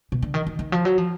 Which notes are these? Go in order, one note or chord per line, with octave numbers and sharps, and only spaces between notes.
B2
D3
D#3
D#3
D#3
F3
F#3
F3